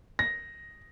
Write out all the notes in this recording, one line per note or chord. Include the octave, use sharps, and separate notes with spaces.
A#6